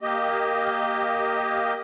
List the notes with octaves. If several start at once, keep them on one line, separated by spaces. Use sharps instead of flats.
A#3 G4 D#5